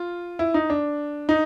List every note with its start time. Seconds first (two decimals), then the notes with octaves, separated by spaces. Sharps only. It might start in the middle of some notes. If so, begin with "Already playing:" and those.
Already playing: F4
0.39 E4
0.54 D#4
0.70 D4
1.29 D#4